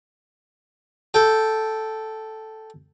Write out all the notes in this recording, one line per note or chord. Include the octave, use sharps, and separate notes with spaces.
A4 G5